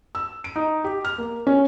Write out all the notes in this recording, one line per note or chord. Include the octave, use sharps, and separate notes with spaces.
E6
D7
D#4
G4
F6
A#3
C#4